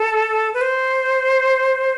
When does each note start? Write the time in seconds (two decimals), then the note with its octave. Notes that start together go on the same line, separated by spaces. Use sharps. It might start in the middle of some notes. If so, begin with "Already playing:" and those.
Already playing: A4
0.54 B4
0.61 C5